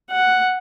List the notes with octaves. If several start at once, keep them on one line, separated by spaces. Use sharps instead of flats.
F#5